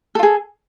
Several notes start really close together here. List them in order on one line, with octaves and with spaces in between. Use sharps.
A4 F4 G#4